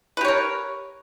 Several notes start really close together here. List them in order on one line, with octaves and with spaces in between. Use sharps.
B4 G4 C#5 A#4